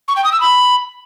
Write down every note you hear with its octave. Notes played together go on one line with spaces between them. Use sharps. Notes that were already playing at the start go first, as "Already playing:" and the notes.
C#6
G5
D#6
E6
B5